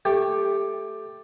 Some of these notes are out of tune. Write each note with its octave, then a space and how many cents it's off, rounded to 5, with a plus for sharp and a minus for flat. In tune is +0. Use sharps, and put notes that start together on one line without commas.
A3 +0 G4 +10 G5 +0